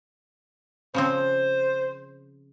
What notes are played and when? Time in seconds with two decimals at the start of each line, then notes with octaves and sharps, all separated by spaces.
0.94 C#3 F3 C4 C5